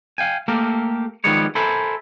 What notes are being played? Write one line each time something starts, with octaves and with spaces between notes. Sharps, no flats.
F5 G5 G#5
A3 A#3 G4 A4 A#4
D#3 F3 G3 G#3 B3 C#5
A4 A#4 C5 E5 G#5 B5